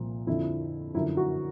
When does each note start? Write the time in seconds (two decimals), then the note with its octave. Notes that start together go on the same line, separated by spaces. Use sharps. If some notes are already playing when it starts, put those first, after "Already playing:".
Already playing: C2 A#2 F3
0.27 F2 D3 F3 E4
0.95 F#2 D3 F3 E4
1.17 F#4